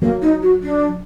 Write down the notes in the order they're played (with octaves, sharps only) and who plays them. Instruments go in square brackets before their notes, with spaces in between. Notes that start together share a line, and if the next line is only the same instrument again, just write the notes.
[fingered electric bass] F#3 [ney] A#3
[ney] D#4
F#4
D4